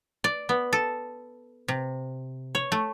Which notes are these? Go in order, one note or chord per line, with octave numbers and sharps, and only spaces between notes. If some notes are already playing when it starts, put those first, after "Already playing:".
D5
B3
A4
C3
C#5
A3